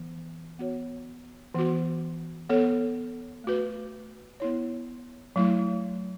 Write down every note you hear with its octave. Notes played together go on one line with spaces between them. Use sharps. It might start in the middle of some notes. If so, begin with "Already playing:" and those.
Already playing: E3 B3
B3 F#4 C#5
E3 B3 F#4
B3 A4 C#5
A3 F#4 B4
B3 E4 C#5
F#3 A3 E4